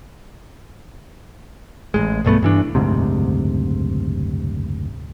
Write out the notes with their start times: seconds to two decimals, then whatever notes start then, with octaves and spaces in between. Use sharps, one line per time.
1.94 A1 G#2 G#3
2.25 B1 G2 A3 B3
2.42 G2 E3 D4
2.75 F#1 D2 G#2 C3